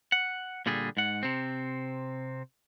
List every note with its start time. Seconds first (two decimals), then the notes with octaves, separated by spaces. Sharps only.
0.12 F#5
0.66 A#2 D3 G3 G#4
0.97 G#2 F#5
1.23 C3 C4